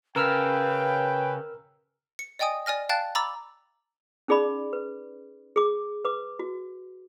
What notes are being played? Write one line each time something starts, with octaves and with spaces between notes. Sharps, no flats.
C#3 A#4 B4 G5 E6 F6
C#7
D5 D#5 G5 G#5 D#6
D5 G#5 F6 A#6
F5 G5 A5 F#6 A6
A#5 B5 D6 E6 A6
C#4 D#4 G#4 D5 B5 D6
B4
G#4 D6
B4 D6
F#4